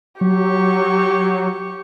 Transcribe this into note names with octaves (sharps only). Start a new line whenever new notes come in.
F#3 G4 C#6